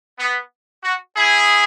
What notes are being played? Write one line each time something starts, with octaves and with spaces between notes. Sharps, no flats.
B3
F#4
E4 G#4